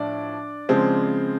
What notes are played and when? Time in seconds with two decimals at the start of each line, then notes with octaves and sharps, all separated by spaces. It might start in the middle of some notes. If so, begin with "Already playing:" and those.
Already playing: A2 F3 D4 D5
0.69 C#3 F3 G#3 C4